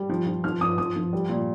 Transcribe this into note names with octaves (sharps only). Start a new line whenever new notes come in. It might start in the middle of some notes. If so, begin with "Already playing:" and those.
Already playing: G3
F3
F3
F3 F6
F3 D#6
F3 D#6
F3
G3
A#2